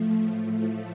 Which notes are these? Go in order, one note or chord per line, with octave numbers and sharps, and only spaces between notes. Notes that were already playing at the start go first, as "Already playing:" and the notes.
Already playing: A2 F3 A3